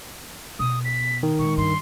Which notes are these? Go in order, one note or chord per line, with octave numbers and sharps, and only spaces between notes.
B2 D#6
B6
D#3
A#2 G#3 C#6
G2 C6